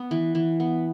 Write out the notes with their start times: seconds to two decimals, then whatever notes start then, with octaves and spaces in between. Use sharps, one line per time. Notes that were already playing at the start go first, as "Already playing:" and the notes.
Already playing: B3
0.11 E3
0.35 E3
0.60 B3